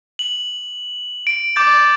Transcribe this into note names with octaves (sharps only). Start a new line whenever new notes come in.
F#7
D7
D6 G6 A6